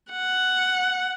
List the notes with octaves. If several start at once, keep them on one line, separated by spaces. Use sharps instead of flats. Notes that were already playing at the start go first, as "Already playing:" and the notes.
F#5